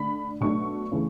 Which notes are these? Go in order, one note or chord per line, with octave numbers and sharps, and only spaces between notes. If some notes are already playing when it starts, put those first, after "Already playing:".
Already playing: D3 A3 D4 B5
B2 F#3 A3 D4 C#6
C#3 E3 A3